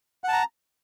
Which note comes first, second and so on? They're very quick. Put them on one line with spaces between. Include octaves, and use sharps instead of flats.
F#5 A5 A#5